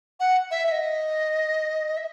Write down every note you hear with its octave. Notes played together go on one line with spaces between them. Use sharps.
F#5
E5
E5
D#5
E5